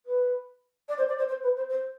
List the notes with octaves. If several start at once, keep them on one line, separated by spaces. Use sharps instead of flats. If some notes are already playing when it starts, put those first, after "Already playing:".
B4
D5
C5
D5
C5
C5
B4
C5
C5